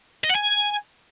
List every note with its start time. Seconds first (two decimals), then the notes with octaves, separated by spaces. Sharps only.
0.24 D#5
0.29 F#5
0.35 G#5